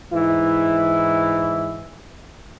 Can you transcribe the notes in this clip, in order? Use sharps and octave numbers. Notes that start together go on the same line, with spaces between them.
G#2 E3 E4